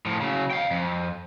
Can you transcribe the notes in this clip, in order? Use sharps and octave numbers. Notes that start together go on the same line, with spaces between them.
A2 F3
C#3 F#3
F5 G5
F2